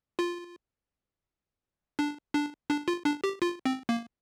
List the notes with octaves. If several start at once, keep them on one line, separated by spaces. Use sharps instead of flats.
F4
D4
D4
D4
F4
D4
G4
F4
C4
A#3